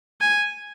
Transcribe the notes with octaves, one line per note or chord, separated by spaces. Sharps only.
G#5